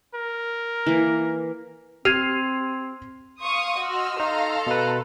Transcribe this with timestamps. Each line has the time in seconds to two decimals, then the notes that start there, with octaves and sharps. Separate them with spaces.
0.14 A#4
0.86 E3 A#3
2.05 C4 G4 F6 G#6 C7 D#7 F7
3.40 F5 C6 C#6 D#6
3.78 F#4 D#5 E6 F6
4.20 D#4 A4 F5 A#5
4.67 B2 B4